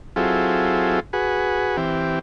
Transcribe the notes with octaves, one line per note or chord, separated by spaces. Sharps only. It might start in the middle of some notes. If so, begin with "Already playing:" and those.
F#3 C4 E4 F4 G#4 A4
F#4 G#4 B4
E3 C4 G4